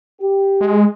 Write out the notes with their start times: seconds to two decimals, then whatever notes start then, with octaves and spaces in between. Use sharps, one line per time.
0.21 G4
0.61 G#3